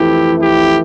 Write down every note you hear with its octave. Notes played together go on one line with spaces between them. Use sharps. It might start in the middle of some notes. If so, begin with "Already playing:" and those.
Already playing: F2 E3 A3 E4 G4
E4 G4